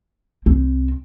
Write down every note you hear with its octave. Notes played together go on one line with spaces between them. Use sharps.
C2 C4